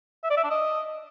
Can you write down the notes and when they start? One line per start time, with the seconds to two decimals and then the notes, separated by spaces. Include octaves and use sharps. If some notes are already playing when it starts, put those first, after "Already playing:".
0.24 E5
0.30 D5
0.37 E5
0.44 D4
0.50 D#5